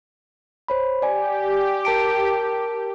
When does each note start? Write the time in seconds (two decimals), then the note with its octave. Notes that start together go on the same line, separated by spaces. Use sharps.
0.68 C5 C#5 B5
1.02 G4 D5 G#5
1.85 A#4 A5 D7